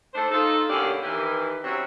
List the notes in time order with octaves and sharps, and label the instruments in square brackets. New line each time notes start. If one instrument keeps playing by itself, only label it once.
[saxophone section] A3 D4 D#4 A4 C5
D#4 F4 A4
B2 D3 A#3 C#4 D4 G4
D#3 E3 G4
F#3 C4 C#4 E4 G4 C#5